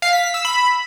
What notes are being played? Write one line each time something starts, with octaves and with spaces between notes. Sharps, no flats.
F5
B6
B6
E6
B5